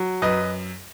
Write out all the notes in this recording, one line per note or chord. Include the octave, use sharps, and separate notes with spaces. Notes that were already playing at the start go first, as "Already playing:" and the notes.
Already playing: F#3
F#2 B4 D#5